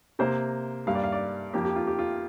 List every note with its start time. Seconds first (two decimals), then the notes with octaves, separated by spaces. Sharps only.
0.19 C3 A#3 C5
0.87 G2 G3 A#3 F5
0.95 D5
1.03 F5
1.12 D5
1.53 F2 F3 A#3 G4
1.65 G4
1.76 F4
1.87 G4
1.99 F4